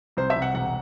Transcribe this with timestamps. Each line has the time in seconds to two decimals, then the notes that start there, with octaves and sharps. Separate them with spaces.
0.17 C2 C5
0.30 E5
0.35 C2
0.42 F#5
0.54 E1 F#5